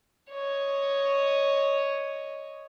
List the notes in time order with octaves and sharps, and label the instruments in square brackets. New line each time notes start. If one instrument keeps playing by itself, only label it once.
[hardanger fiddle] C#5 D#5